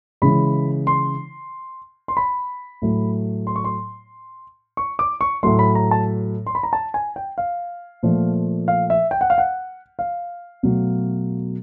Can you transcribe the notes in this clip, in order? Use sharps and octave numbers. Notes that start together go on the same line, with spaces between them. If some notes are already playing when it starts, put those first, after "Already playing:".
C#3 E3 G#3 B5
C6
C6
B5
A2 F#3 A3
C6
C#6
C6
C#6
D6
C#6
A2 F#3 A3 C6
B5
A#5
A5
C6
B5
A#5
A5
G#5
G5
F5
A#2 F3 A3
F5
E5
G5
F#5
F5
F#5
F5
B2 F#3 A3